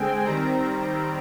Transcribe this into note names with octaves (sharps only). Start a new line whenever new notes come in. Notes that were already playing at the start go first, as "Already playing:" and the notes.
Already playing: D3 G#3 C4 G5 G#5
D#3 G3 C4 A#5